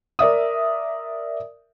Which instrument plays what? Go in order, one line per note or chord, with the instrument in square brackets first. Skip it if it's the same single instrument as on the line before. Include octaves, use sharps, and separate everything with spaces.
[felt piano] A#4 D5 E5 D#6